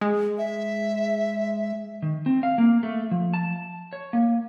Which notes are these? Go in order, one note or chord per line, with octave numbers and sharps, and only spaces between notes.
G#3
E5
D#3
C4
F5
A#3
A3
F3
A5
C#5
A#3